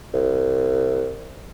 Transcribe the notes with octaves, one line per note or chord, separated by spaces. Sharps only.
C2